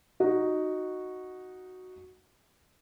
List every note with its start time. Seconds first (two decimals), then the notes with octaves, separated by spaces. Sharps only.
0.20 D#4 F#4